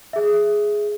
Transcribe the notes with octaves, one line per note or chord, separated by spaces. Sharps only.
G#4 E5